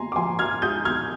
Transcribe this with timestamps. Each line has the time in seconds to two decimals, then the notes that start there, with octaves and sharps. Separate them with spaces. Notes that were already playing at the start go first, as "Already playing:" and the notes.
Already playing: A#3 G#5 A#5 C6
0.12 D6
0.16 F3 G#5 C6
0.39 F6 G#6
0.62 G#2 D#6 G6
0.85 F6 G#6